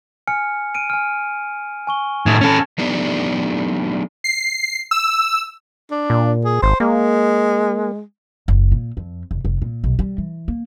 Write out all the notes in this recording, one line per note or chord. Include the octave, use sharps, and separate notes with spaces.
G#5 F6 C#7
F6 D7 D#7
G#5 F6
G#5 C#6 G7
A2 D#3 G#6 A6
C#4 A4
F#3 A3 B3 D4 D#4 G4
C7
E6
D4
A#2
G#4
G#1 C5
G#3 A#3
F#1
A#2
F2
F1
F1
A#2
B1
G3
E3
A#3